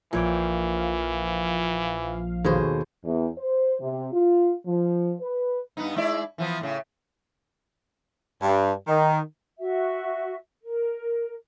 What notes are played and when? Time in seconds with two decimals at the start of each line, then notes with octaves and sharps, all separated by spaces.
0.13 A#1 A#2 E3 F3 C#5 F5 G5
2.44 D#2 B2 G#4 A4 C5
3.05 E2
3.38 C5
3.81 C3
4.12 F4
4.66 F3
5.21 B4
5.77 G2 B3 D#4
5.96 G#3 E4 D5
6.38 E3 F3 B3
6.60 A2 C#3
8.41 G2
8.88 D#3
9.59 F#4 E5
10.61 A#4